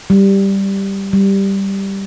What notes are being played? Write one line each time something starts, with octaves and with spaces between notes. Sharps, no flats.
G3
G3